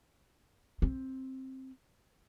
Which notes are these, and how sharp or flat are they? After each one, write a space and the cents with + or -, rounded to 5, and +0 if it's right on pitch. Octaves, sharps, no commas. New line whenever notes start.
C4 +10